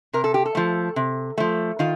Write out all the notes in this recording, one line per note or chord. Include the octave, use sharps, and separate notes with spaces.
C3 A#4
A4
G4
A4
F3 A3
C3
F3 A3
D#3 F4